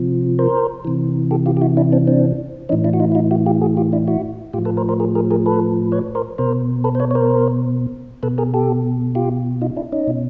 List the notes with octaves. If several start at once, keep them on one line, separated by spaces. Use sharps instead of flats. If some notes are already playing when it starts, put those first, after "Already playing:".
Already playing: C3 F3
A#4 C5
C3 E3
G4 A4
F4 G4
G4
E4 F#4
D4 E4
C4 D4
C4 D4
A2 E3 C#4 D#4
D4 E4
F#4
D#4 F4
E4
D#4 F4
E4 F#4
F4 G4
F#4 G#4
F4 G4
D4 E4
E4 F#4
A2 F3 F4 G4
A4 B4
A#4 C5
A#4 C5
G#4 A#4
G#4 A#4
G#4 A#4
A4 B4
B4 C#5
A#4 C5
B2 A#4 C5
A4 B4
C5
B4 C#5
C#5
A#4 C5
B2 A4 B4
G#4 A#4
G4 A4
F4 G4
D#4 F4
D4 E4
C#4 D#4
B2